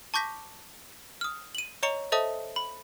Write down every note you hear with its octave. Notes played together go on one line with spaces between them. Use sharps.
A5 C#6 D6 G6 A#6 B6
D#6 F6
D#7 F#7
C#5 D#5 A#5 C#6 C#7 F7
A4 C5 D#5 E5 A5 D#6
B5